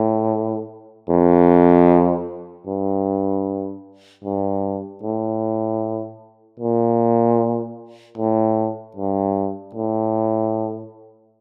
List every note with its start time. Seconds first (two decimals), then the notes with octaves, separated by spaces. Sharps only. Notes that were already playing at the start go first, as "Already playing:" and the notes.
Already playing: A2
1.09 F2
2.67 G2
4.24 G2
5.03 A2
6.60 A#2
8.17 A2
8.96 G2
9.74 A2